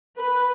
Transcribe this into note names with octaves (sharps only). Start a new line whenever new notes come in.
B4